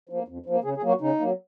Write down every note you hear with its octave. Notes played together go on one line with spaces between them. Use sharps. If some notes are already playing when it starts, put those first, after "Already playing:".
F3 A#3
F2
F3 A#3
C#3 G#4
G#4
F#3 A#3
F#4
C#3 D#4
F#3 A#3